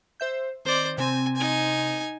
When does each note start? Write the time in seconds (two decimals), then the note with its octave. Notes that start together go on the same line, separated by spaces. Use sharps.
0.20 C5 E5 G6
0.65 D#3 C4 C5 D5
0.98 C3 C4 G#5
1.36 D#4 G#5